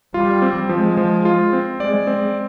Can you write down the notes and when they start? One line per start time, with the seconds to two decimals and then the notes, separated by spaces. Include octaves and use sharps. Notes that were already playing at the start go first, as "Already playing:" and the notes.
0.14 G3 F4
0.42 C4
0.69 F3 G#3
0.97 F3
1.25 F4
1.53 C4
1.80 G#3 D5
2.07 C4